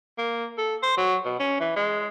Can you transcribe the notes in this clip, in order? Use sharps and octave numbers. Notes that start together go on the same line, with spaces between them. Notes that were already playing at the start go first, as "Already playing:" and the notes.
A#3
A4
C5
F#3
B2
C#4
E3
G#3